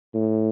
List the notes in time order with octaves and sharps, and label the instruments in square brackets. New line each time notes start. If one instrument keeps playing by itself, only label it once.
[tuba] A2